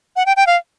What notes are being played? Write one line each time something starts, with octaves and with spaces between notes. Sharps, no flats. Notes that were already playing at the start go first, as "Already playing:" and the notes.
F#5
G5
G5
F5